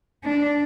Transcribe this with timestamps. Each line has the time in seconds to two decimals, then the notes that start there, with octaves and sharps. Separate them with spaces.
0.25 D4